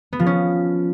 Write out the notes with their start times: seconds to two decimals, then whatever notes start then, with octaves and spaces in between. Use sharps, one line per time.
0.13 B3
0.20 F3
0.26 C#4